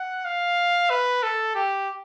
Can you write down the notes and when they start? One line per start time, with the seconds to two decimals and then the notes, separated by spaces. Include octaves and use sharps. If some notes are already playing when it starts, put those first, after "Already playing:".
Already playing: F#5
0.25 F5
0.90 B4
1.23 A4
1.55 G4